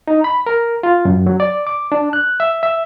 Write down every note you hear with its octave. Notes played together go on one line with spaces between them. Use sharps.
D#4
B5
A#4
F4
F#2
F#3
D5
D6
D4
F#6
E5
E5